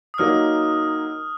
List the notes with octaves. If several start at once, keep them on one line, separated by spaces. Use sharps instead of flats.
D#6
F#3 A#3 D#4 F6